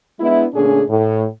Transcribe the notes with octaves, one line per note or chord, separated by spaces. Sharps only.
G#3 B3 D4 E4
A#2 D3 A3 C#4 D4 G#4
A2